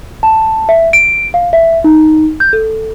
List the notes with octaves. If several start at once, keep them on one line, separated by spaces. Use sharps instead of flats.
A5
E5
D7
F5
E5
D#4
G6
A4